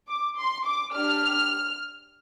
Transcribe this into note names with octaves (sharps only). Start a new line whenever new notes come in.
D6
C6
D6
D4 G4 F6